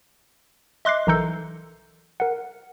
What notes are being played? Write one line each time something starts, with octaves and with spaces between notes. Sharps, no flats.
D#5 E5 C6 D6 F#6 C7
B1 E3 A4 A#4 A#5 G6
A#4 F#5